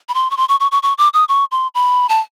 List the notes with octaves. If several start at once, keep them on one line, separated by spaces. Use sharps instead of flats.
B5
C6
C#6
C6
C#6
C#6
C#6
C#6
D6
D#6
C#6
C6
B5
A5